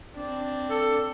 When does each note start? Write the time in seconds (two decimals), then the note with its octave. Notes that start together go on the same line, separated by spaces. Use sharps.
0.15 C4 D4
0.70 A4